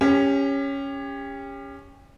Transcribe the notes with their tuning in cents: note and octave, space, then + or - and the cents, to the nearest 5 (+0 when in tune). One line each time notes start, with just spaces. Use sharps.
C#4 +0 G4 +35